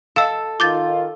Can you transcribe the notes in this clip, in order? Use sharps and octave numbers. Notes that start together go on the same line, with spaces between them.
A4 D#5 F5 E6 E7
D#3 F4 D6 G6 A6